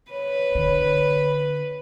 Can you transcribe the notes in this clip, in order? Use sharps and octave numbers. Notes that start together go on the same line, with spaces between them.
B4 C#5
D3